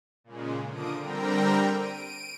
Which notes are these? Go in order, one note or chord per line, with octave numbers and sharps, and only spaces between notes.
A#2 C#3 G#3
D3 F3 A#3 D#6 D7
D3 G3 C4 A#4 G5 A#5
D7 D#7